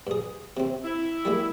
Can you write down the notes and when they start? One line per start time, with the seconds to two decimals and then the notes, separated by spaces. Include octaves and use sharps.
0.07 G2 G#4
0.57 C3 C4
0.84 E4
1.25 G3 G#3 A#3